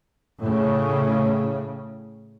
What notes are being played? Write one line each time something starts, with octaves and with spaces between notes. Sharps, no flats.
A2 C#3